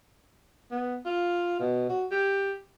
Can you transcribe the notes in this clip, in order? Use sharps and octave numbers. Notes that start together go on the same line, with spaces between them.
B3
F4
B2
F#4
G4